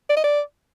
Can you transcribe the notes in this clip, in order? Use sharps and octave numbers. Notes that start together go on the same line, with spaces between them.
D5
D#5
D5